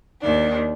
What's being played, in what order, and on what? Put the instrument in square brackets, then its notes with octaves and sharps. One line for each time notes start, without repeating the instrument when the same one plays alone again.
[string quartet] D#2 D#3 D4